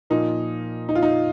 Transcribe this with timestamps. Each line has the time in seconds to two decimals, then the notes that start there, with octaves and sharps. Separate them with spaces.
0.10 A#2 F3 A#3 D#4
0.89 D#4
0.95 F4
1.03 D#4